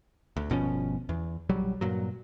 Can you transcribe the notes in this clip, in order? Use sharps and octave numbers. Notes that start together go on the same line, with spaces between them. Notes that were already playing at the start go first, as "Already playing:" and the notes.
D2
G1 B2 F3 C#4
E2
A#1 F#3 G3
G2 A#2 F#3